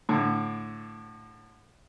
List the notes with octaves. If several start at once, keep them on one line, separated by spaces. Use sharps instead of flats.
A2 D3